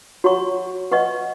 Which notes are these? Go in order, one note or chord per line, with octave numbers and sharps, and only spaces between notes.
F#4 C#5 F#5 A#5 C#6
B4 D#5 F#5 C#6